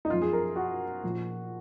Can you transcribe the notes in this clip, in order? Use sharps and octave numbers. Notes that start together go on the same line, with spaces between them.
D#4
F#2 F3 F4
G#4
A#4
F#4
A#2 F3